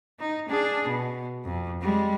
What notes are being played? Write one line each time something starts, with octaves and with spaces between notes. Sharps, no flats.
D#4
D4 G#4
B2
F2
G3 G#3